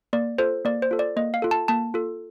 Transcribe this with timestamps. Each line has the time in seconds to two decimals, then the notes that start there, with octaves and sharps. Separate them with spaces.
0.13 A#3 D5
0.38 F4 A4 C5
0.65 A#3 D5
0.82 C5
0.91 F4 A4
0.99 D5
1.17 A#3 D#5
1.34 F5
1.42 F4 A4
1.51 A5
1.68 A#3 A5
1.94 F4 A4